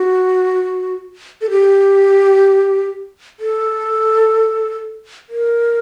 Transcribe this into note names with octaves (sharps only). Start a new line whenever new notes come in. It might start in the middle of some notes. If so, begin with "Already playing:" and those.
Already playing: F#4
A4
G4
A4
A#4